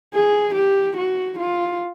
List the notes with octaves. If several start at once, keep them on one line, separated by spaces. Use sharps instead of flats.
G#4
G4
F#4
F4